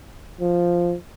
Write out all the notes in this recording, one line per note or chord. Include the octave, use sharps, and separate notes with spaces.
F3